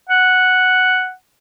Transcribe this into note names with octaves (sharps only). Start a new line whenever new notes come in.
F#5